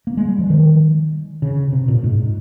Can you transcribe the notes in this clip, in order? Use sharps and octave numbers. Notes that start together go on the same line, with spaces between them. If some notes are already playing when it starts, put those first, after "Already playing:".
A#3
G#3
G3
F3
D#3
C#3
C3
A#2
G#2